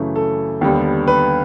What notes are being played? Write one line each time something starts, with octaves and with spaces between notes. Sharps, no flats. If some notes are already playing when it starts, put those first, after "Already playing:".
Already playing: F#2 C#3 E3 A3
A4
D#2 D3 G3 B3
B4